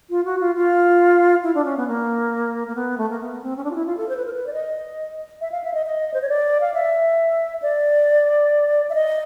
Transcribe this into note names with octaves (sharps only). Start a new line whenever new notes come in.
F4
F#4
F4
F4
E4
D4
C#4
B3
A#3
A#3
B3
A3
A#3
B3
C4
C#4
D4
F4
E4
F4
A4
C5
B4
A#4
B4
D5
D#5
E5
F5
E5
D#5
D#5
C5
C#5
D5
F5
E5
D5
E5
D#5